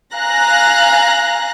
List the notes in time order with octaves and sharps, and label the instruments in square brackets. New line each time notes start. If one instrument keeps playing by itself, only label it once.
[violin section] F5 G#5 A#5 F#6 A#6